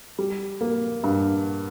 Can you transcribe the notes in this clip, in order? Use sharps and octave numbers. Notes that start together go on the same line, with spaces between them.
G3
A#3
G2